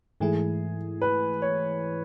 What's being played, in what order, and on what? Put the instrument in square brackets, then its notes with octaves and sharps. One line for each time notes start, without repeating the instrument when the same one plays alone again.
[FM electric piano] G#2 E3 A3 E4 [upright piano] G#4
[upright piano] B4
C#5